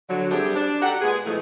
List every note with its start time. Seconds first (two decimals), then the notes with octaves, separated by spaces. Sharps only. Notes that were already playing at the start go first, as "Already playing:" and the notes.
0.10 D3 F#3
0.31 G3 A3 C4 D4 G4 G#4
0.56 D4
0.82 D#4 G4 A4 F#5
1.02 A#2 G#3 B3 G#4
1.26 B2 E3 F3 G#3 A3